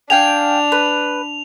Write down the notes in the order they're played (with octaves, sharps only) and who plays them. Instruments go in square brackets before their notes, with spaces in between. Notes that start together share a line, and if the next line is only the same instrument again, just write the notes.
[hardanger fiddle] D4 [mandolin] F5 G5 G#5 [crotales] F7
[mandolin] B4